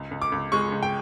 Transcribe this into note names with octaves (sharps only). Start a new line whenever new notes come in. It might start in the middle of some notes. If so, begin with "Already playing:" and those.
Already playing: C#2
C#2
D6
C#2
G#3 C#6
C#2
G5